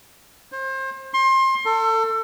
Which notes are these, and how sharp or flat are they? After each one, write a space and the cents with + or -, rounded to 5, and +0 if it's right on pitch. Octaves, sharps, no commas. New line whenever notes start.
C5 +30
C6 +30
A4 +30